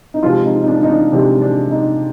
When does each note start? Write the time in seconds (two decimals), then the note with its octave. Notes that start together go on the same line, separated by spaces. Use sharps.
0.14 D#4
0.23 C3 F3 G#3 F4
0.45 D#4
0.62 D#4
0.68 D4
0.83 D#4
0.89 D4
1.11 C3 F3 G#3 D4
1.42 D4
1.71 D#4